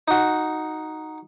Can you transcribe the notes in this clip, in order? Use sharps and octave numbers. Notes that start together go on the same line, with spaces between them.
D#4 F#4